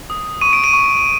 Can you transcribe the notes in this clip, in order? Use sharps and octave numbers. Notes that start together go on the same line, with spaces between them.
D#6
C#6 D#7
D7
D#7
C#6